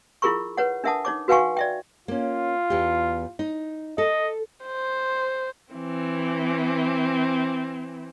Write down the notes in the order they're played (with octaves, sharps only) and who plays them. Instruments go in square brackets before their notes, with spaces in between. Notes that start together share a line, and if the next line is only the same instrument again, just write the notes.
[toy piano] E4 F4 G#4 A#4 B5 C#6
B4 C#5 F#5
D4 A#4 E5 F#5 A5 D#6
D#4 C#5 D6
F#4 B4 F5 F#5 G#5 C#6
D5 E5 G5
[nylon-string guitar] A#3 C#4 [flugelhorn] F4
[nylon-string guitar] E2 G4
D#4
[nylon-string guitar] A4 [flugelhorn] D#5
[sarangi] C5
[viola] E3 C4